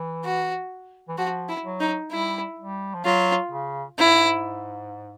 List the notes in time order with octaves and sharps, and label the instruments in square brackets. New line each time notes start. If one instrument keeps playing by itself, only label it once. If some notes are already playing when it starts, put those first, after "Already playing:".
Already playing: [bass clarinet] E3
[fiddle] F#4
[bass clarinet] E3
[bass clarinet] F3 [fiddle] F#4
[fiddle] E4
[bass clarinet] F#3
[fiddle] D#4
[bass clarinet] G3 [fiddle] E4
[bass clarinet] G3
F3
[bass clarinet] F#3 [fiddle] F4
[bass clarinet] C#3
[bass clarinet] G#2 [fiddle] E4